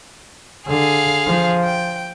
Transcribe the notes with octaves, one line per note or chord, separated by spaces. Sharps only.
D3 G#4 F5
F3
G5